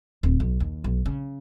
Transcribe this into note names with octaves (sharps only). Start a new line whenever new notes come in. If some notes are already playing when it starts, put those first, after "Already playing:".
D1
B1
D#2
B1
C#3